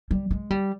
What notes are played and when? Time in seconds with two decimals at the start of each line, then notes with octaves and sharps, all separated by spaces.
0.11 G3
0.31 G#3
0.50 G3